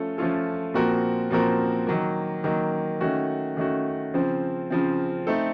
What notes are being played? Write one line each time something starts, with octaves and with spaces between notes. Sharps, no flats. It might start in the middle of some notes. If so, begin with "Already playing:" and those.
Already playing: F3 A3 C#4 F4 A4
F3 A3 C#4 F4 A4
A#2 F3 C4 F#4 A#4
A#2 F3 C4 F#4 A#4
D#3 F#3 A#3
D#3 F#3 A#3
D#3 A3 C#4 F#4
D#3 A3 C#4 F#4
C#3 F3 C4
C#3 F3 C4
A3 C4 D#4 A4